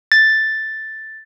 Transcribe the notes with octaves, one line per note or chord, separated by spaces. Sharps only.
A6